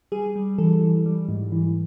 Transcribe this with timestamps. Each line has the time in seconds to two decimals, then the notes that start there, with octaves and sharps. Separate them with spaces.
0.12 G3 G#4
0.36 G3
0.58 E3 A4
0.82 E3
1.06 G3
1.29 G#2
1.52 E3